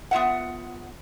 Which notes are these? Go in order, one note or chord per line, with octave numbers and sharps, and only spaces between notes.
B3 F4 E5 F#5